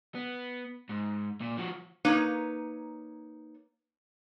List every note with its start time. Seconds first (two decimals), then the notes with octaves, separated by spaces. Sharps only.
0.15 B3
0.89 G#2
1.41 A#2
1.57 F3 F#4
2.05 A#3 D#4 B4 C#5